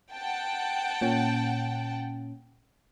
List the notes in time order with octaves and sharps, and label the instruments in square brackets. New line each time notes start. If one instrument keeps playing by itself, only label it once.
[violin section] F#5 G5 A5
[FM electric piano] A#2 C#4